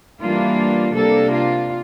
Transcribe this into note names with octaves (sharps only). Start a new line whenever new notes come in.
E3 G3 A#3 D4 F4
C3 G3 A#3 D4 A4
F4